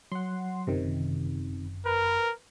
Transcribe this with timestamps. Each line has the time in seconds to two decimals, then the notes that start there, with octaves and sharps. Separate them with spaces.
0.12 F#3 F#5 C6
0.67 G1 F#2 C3 D#3
1.86 A#4 B4